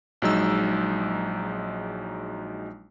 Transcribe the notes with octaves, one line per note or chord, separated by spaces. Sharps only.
A#1 F#3 G#3 D#4 E6